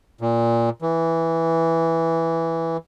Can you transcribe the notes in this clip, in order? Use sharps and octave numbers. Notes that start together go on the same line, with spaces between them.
A#2
E3